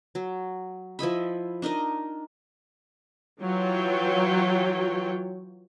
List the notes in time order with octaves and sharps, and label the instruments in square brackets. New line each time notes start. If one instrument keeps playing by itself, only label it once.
[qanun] F#3
F3 E4 D#5 B5
D4 D#4 A#4 D#5
[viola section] E3 F#3 F4 C#5 G5